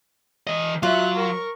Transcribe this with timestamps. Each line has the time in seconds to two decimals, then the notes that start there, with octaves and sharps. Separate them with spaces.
0.47 E3 D#5
0.83 F#3 F4 E5 F#6
1.15 A#4 C#6